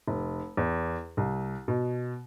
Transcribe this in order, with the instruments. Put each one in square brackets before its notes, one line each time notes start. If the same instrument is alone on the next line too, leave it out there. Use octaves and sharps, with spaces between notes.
[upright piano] F1
E2
C2
B2